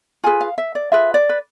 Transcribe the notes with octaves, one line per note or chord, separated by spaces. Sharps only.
F4 G#4 B4 G#5
F5
E5
D5
F4 G#4 B4 E5
D5
B4